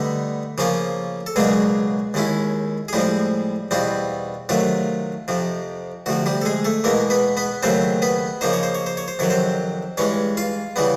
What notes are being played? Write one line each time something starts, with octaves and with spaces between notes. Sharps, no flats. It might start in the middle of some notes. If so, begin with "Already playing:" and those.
Already playing: D3 G3 A3 B3 D#4 A4
C#3 F3 A#3 C#4 F4
A4
C#2 B2 F#3 G#3 A#3 D4 G#4
D#2 D#3 G#3 C#4 E4
G#4
A2 F3 G3 G#3 C4 G4
E2 B2 G3 C4 F4
C3 D#3 F#3 A3 F4
F2 C3 F3
D2 C3 F3 F#4
G3 G4
A4
G#3 G#4
A3 A4
E2 B2 G#3 A#3 A#4
B3 B4
B3 B4
D#2 C#3 F#3 A3 C4 C5
B3 B4
C#3 F3 A#3 D#4 C5
C#5
C5
C#5
C5
C#5
C5
F2 C3 D#3 F#3 C#5
C4 C5
G2 E3 G#3 C#4 C#5
F4 F5
C#3 E3 G3 B3